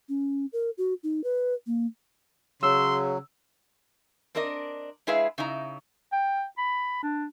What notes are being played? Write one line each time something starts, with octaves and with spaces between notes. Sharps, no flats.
C#4
A#4
F#4
D#4
B4
A#3
C#3 F#3 C6 E6
C4 D4 A#4 D5 D#5
G#3 E4 G#4 B4 E5 F5
C#3 D#4 E4 A#5
G5
B5
D4